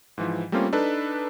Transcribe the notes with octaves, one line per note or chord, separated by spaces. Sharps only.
G#2 E3 F3
G3 A3 A#3 C4 C#4 F4
D4 D#4 A4 B4